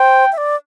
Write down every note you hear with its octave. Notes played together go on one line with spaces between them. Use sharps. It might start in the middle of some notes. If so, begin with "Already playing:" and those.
Already playing: C5 G5
E5
D5